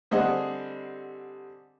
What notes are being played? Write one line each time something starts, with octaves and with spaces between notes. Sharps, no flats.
D3 G3 C4 G#4 D#5 F#5